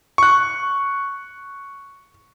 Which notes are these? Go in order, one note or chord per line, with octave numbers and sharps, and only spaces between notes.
C#6 F#6